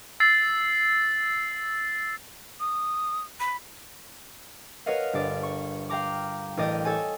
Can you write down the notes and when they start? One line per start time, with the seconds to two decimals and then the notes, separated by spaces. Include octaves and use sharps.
0.20 E6 A6 C7
2.60 D#6
3.40 B5
4.86 A#4 B4 C#5 D#5 F5 F#5
5.13 G1 D5
5.43 C#6
5.89 F5 G5 A#5 D6
6.57 A1 A#4 D5 D#5 G5 D#6
6.85 A4 C#5 G#5